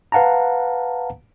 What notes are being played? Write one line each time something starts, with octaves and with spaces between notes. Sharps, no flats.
B4 F5 F#5 A5 A#5